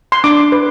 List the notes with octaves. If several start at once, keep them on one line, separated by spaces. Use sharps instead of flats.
C6
D4 D6
B4